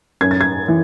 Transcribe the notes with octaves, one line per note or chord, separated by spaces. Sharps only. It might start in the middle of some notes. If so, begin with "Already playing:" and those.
F#2 G#6
A6
G#6
E3